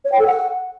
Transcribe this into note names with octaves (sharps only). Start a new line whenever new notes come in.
C#5
G5
A4
F#5